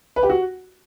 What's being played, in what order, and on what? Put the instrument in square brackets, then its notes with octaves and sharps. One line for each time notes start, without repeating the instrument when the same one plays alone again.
[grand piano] B4
G4
F#4